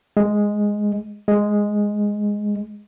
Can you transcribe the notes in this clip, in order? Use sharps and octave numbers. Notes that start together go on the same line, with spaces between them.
G#3
G#3